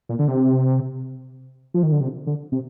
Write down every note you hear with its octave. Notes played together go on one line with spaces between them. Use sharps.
A#2
D3
C3
F3
D#3
D3
C3
D3
C3